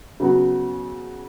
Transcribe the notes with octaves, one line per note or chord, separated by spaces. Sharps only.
C#3 F#3 B3 F#4